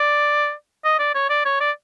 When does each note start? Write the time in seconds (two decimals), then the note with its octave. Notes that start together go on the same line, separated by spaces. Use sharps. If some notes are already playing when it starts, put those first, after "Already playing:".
Already playing: D5
0.84 D#5
0.99 D5
1.15 C#5
1.30 D5
1.45 C#5
1.60 D5